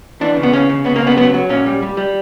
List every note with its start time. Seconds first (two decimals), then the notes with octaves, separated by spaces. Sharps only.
0.21 E3 D4
0.37 C#3
0.43 B3
0.53 C#3 C#4
0.69 C#3
0.85 C#3 B3
0.96 A#3
1.02 C#3 B3
1.17 F#3 B3
1.34 F#3
1.49 A#2 C#4
1.66 G3
1.82 G3
1.97 G3